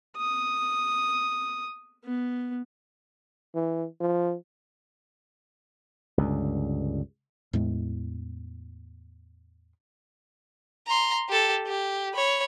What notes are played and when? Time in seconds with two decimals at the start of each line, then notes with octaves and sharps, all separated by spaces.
0.17 D#6
2.04 B3
3.55 E3
4.01 F3
6.18 C#2 G2 D3
7.53 E2 A2 G#3
10.87 A#5 C6
11.29 G4 A4
11.66 G4
12.14 C#5 B5